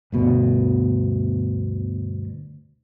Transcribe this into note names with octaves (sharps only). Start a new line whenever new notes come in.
G1 D2 B2